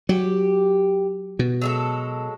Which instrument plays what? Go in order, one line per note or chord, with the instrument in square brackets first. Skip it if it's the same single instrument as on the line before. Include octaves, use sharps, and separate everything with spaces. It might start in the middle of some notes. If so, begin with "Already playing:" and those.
[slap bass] F#3 [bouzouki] G4
[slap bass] B2
[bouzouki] F#3 G#3 A4